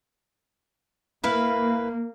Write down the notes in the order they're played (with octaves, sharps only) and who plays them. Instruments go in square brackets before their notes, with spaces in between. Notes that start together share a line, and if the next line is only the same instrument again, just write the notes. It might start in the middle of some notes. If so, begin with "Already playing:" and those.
[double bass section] A#3 [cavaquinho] E4 B4 F5